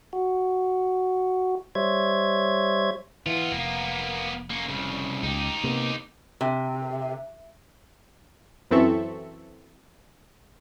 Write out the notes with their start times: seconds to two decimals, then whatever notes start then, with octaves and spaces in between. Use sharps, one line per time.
0.13 F#4
1.75 G3 C5 C#5 E5 G#6
3.26 E3 B3 F4
3.52 F1 A#3 B3
4.50 A#3 C#4
4.68 C2 C#3
5.23 C#2 D#4 G4
5.64 C3 A#3 B3
6.41 C3
8.71 F#2 E3 C4 A4 E5 C#6